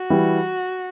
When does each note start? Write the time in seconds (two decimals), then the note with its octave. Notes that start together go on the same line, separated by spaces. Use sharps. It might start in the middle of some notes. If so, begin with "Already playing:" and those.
Already playing: F#4
0.10 E3 G3